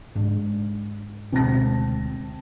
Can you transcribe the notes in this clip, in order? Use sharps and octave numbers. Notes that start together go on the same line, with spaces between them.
G#2 G#3 D4
D2 B2 G#3 C4 A5 A#6